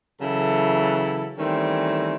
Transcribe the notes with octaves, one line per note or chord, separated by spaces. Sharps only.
C#3 E3 F#3 E4 A4
D#3 E3 G3 A3 C4 C#4